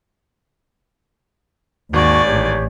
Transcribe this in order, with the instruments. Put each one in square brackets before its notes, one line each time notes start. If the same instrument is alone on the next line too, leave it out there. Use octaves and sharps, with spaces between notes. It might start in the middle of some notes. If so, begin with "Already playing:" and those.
[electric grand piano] G#1 [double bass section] D#2 [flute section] F#4 C#6 [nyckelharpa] D5 G#5
[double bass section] A1 A2 [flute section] G4 C#5